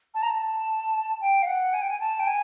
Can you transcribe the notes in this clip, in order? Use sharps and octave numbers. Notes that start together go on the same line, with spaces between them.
A5
A#5
A5
G5
F5
F#5
G#5
G5
G#5
A5
G5
G#5